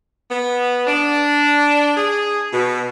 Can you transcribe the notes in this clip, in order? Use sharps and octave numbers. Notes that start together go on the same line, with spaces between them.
B3
D4
G#4
B2